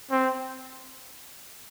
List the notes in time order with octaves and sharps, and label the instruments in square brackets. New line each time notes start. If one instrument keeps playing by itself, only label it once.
[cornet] C4